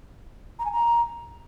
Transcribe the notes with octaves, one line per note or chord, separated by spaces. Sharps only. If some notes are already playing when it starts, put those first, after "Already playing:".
A#5
G#5
A#5